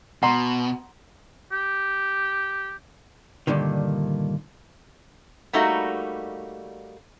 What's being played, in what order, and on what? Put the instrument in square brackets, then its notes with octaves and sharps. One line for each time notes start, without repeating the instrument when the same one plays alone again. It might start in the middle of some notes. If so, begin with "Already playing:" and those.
[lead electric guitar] B2 [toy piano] F#5 A#5 C6
[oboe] G4
[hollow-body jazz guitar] G2 A#2 D3 D#3
[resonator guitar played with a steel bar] G3 A3 A#3 D#4 F#4